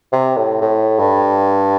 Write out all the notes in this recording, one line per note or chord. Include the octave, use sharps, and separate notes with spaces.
C3
A2
A2
G2